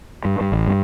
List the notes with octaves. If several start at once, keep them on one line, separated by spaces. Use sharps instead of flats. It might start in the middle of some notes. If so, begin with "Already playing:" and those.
G2
G2
A1
G2